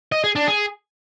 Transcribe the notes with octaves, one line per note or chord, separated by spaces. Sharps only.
D#5
G#4
D4
G#4